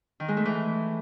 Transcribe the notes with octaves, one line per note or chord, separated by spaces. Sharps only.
D#3
G#3
A3
E3